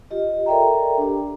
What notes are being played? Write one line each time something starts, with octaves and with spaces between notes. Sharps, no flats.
F4 G4 D#5
A4 A#4 D5 E5 G5 A#5
D4 G4